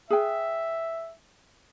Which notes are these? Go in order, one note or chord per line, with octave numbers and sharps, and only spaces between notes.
G#4 B4 E5 G5